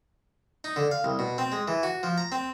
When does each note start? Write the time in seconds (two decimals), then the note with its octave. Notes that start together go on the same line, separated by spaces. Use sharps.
0.64 D#4
0.76 D3
0.91 F5
1.04 C2
1.19 B2
1.38 C4
1.52 G#3
1.68 E3
1.83 F#4
2.03 F3
2.18 A#5
2.32 C4